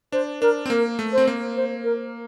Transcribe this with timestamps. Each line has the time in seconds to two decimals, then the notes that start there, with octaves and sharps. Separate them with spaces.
0.12 D4 C5
0.42 D4 A#4
0.66 C4
0.70 A#3 A#4
0.99 A3
1.13 C4 C5
1.27 A#3
1.56 C5
1.84 A#4